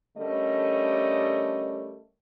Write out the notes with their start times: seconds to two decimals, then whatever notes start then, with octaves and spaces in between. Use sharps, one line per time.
0.18 D3 G3 A3 C#4 A#4 D#5